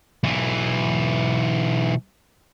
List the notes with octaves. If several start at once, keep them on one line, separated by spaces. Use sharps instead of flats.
B1 E3